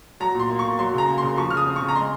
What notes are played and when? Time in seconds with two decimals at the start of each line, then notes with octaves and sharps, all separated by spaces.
0.20 F#3 A#5
0.35 A#2 C6
0.50 A#3
0.59 C#6
0.65 A#2
0.79 F#3 C6
0.93 C#3 A#5
1.08 A#3
1.18 C#3 C6
1.38 F3 C#6
1.50 C#3 F6
1.57 D#6
1.67 C4
1.76 C#3 C#6
1.89 A#5
1.96 G#3 C6